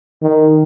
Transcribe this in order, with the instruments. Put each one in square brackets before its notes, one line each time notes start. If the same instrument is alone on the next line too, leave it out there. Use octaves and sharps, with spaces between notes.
[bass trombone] D#3